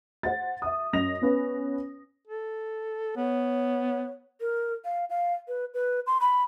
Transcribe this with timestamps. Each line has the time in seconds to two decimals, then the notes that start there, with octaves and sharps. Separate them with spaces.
0.23 C5 F#5 A6
0.62 E5 D#6
0.93 F#2 D#5 A#6 F7
1.22 B3 C#4 B4 C#5
2.27 A4
3.16 B3 C#5
4.41 A#4
4.85 F5
5.10 F5
5.48 B4
5.74 B4
6.07 C6
6.21 B5